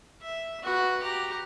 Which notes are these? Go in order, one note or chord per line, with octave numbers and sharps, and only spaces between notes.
E5
F#4 B4
G4 A#5